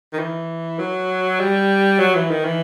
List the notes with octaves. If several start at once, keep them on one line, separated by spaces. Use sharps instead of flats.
D#3
E3
F#3
G3
F#3
E3
D#3
E3